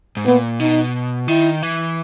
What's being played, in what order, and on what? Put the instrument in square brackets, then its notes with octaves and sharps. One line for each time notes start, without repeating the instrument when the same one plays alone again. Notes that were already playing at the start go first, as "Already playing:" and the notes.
[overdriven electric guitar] G#2
[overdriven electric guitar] A#2 [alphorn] B3
[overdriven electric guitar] B2 [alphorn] D#4
[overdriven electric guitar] D#3 [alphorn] E4
[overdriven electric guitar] E3